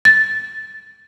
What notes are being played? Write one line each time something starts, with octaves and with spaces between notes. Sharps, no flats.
A6